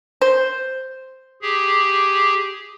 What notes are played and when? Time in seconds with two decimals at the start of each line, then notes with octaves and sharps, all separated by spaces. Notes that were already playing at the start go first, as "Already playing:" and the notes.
0.22 C5
1.42 G4 G#4